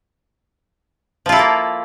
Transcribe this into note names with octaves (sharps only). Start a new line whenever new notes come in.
F3 A#3 E4 F4 A4